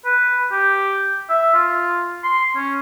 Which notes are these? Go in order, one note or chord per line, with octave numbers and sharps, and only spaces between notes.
B4
G4
E5
F4
C6
C#4